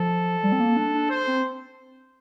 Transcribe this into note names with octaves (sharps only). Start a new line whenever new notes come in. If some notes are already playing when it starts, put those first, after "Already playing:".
Already playing: F3 A4
G3
C4
A#3
D4
D4
C5
C4